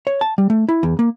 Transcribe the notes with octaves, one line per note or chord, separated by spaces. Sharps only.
C#5
A5
G3
A3
E4
E2
A#3